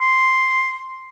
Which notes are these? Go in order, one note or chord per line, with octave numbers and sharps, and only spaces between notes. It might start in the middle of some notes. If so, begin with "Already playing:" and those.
C6